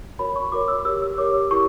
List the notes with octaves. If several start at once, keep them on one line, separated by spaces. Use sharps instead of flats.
F#4 A#4 C#5 B5
C#6
F#4 A#4 C#5 D6
E6
G4 A#4 C#5 E6
E6
G4 A#4 C#5 D6
E4 G4 A#4 C#6